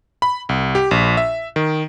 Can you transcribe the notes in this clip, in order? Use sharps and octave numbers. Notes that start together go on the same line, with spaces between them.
B5
C2
G4
A#1
E5
D#3